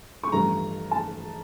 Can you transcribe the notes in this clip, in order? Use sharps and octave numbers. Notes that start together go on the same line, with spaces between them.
C#6
A1 G2 F3 A3 A#5
A5